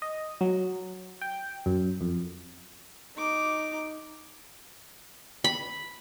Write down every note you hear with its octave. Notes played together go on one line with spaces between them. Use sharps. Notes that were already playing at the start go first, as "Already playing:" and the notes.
D#5
F#3
G5
F#2
F2
D#4 D6
B5